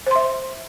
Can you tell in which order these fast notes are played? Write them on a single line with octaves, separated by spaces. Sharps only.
C5 C6 E5